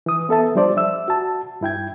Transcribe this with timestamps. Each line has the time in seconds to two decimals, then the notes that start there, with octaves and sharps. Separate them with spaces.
0.06 E3 D#6
0.29 B3 A4 E5 A5
0.55 F3 G3 D4 C5 D5
0.77 E5 E6
1.08 F#4 A5
1.61 G2 E4 G5 G#6